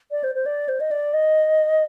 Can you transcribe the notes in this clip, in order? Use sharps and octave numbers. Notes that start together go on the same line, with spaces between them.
D5
C5
C5
D5
C5
D#5
D5
D#5